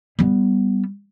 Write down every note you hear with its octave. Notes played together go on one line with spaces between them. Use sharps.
G3 B3